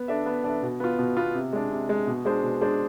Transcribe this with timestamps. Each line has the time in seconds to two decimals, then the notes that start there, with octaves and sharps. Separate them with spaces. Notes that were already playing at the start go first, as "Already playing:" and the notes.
Already playing: B3
0.08 D4 A4 E5
0.26 B3
0.44 D4 A4 E5
0.63 B2
0.80 B3 F4
0.99 B2
1.17 B3 F4
1.34 C3
1.53 G#3 D4
1.71 C3
1.89 G#3 D4
2.07 B2
2.25 G#3 D4 G#4 C5
2.43 B2
2.61 G#3 D4 G#4 C5